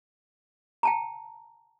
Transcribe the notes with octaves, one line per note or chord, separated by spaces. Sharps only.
G5 A5 A#5